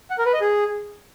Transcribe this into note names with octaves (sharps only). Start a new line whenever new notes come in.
F#5
A#4
B4
D#5
G#4